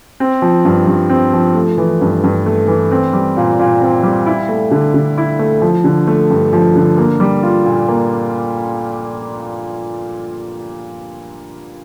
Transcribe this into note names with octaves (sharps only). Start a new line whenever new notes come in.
C4
F3
G2
G2
C4
F3
A3
E3
G2
G2
A3
E3
C4
G3
A#2
A#2
C4
G3
E4
A3
D3
D3
E4
A3
F3
D3
A3
G2
F3
D3
A#3
G3
F4
A#2
A#3